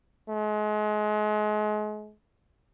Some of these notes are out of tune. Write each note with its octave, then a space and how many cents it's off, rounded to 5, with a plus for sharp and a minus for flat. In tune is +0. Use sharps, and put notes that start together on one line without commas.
G#3 +35